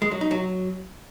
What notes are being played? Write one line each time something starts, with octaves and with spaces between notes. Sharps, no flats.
G#3
F#3
D#4
F#3